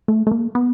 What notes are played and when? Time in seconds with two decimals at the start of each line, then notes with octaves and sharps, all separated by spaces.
0.08 A3
0.27 A3
0.31 A#3
0.55 B3